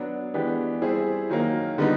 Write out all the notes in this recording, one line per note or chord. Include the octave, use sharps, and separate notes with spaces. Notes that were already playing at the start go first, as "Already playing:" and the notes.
Already playing: F#3 B3 D4
E3 G#3 B3 D4 G4
G3 C4 E4 G#4
D#3 F#3 A#3
D3 G3 B3 D#4